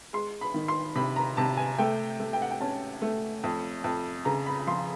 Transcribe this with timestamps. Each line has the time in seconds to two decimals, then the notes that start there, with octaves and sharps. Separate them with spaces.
0.13 G#3 C6
0.41 B5
0.54 D#3
0.68 C6
0.95 C3 B5
1.16 A#5
1.37 C3 A5
1.57 G#5
1.79 A3 G5
2.20 A3
2.33 G5
2.42 F#5
2.51 G5
2.61 C#4 A5
3.02 A3
3.44 F2
3.84 F2
4.25 C#3 A#5
4.46 B5
4.67 F3 C6